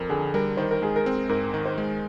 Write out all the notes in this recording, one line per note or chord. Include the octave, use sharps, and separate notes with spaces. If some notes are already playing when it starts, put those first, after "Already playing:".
Already playing: F2 A#4
D3 G#4
G3 A#4
D#3 C5
A#4
G#3 G#4
A#4
C4
G#2 A#4
D#3
C5
G#3